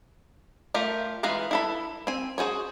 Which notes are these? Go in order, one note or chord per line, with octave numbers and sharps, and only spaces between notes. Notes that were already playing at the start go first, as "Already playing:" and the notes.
A3 F4 G4 A#4
E3 G#3 B4 F5 A#5
E4 A4 B5
C4 G#5
F#4 G#4 C5 C#5